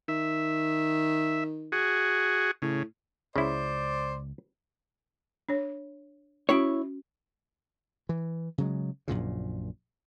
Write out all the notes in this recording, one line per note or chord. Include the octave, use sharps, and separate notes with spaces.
D#3 E5
F#4 G#4
A2 C#3
C#2 C#3 E4 C5 D5
D4 C#5
C#4 E4 F#4 C#5
E3
C#3 F#3 G#3
A#1 F#2 A#2 C#3